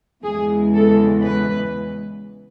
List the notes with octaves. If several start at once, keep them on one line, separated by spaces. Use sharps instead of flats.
E2 C#3 E3 G#3 G#4
A4
B4